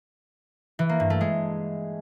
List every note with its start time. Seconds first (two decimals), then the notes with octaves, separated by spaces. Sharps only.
0.79 E3
0.89 A#3
1.00 G2
1.10 A3
1.21 G#3